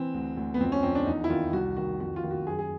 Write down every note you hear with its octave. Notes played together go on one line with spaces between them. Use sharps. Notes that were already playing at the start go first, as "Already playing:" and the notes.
Already playing: E3 C4
D2
D2
B3
F2 C4
C#4
F2 C4
D4
E2 D#4
E4
D#3 F4
C2 F#4
D#3 F#4
F2 F#4
F4
D#3
F#4
F#2 G#4
G#4